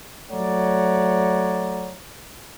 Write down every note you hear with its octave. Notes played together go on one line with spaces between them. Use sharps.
F#3 A3 C#5 D5 F#5 A#5